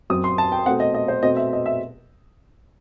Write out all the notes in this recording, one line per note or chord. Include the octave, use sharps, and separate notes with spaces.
F#2 F#3 C4 D#6
C6
A5
G5
B2 A3 C4 F#5
D#5
D#5
C5
B2 A3 C4 D#5
E5
D#5
E5